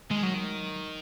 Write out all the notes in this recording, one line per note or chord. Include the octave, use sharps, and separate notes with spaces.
D#3 G#3
F#3